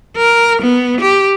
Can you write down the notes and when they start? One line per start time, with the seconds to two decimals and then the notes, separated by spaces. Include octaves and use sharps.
0.17 A#4
0.62 B3
1.01 G4